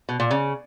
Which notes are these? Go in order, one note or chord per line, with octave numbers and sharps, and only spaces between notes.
B2
A#2
C#3